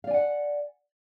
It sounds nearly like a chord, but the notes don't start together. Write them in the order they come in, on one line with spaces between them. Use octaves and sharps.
F5 D5 G#5 F#5